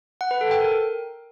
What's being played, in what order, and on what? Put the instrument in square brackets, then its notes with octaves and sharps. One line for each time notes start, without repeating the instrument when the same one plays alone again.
[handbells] F#5
B4
A4
G5
A#4